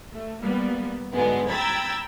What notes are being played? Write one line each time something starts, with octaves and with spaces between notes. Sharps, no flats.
A3
G3 A#3 B3
G#2 D3 F#3 G#3 B3
G5 A#5 B5 E6 G#6 A6